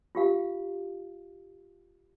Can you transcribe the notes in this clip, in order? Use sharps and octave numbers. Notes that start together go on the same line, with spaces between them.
F4 G4 F5